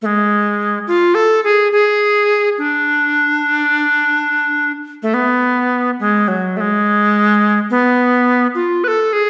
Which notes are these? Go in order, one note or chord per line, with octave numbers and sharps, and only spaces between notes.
A3
G#3
F4
A4
G#4
G#4
D4
A3
B3
G#3
F#3
A3
G#3
B3
F4
B4
A4
G#4